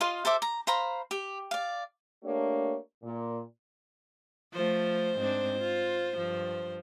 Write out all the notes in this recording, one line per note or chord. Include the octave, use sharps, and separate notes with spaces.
F4 D#5 F5 C6
A4 C5 E5 D6
A#5
C5 F5 A#5 B5
G4
D5 F5
A3 A#3 D4 G4 C#5
A#2
F3 A3 C5
G#2 C4 D4
F4
G2 F3